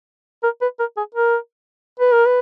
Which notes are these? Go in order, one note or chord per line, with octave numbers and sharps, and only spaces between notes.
A#4
B4
A#4
G#4
A#4
B4
A#4
B4